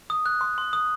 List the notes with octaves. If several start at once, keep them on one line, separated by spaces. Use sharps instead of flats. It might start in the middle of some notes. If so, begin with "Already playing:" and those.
D#6
F#6
C6
C6
D#6